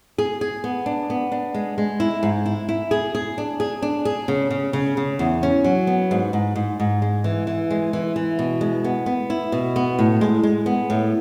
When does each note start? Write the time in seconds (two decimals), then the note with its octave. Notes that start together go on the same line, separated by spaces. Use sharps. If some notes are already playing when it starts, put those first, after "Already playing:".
0.18 G#4
0.41 G#4
0.64 B3
0.86 D4
1.10 B3
1.32 D4
1.54 G#3
1.78 G#3
2.00 E4
2.23 G#2
2.46 E4
2.69 E4
2.91 G#4
3.15 G#4
3.38 D4
3.60 G#4
3.82 D4
4.05 G#4
4.28 C#3
4.50 C#3
4.73 C#3
4.97 C#3
5.19 E2
5.43 C#4
5.64 F#3
5.87 B3
6.11 G#2
6.33 G#2
6.56 G#2
6.80 G#2
7.02 G#3
7.24 E3
7.47 E3
7.70 G#3
7.93 E3
8.16 E3
8.39 B2
8.61 G#3
8.84 B3
9.06 B3
9.30 E4
9.52 B2
9.76 B3
9.99 A2
10.21 G#3
10.43 G#3
10.66 B3
10.90 A2